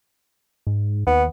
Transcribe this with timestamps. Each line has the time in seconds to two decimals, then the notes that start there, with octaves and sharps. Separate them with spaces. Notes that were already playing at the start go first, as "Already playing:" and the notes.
0.67 G#2
1.07 D#2 B3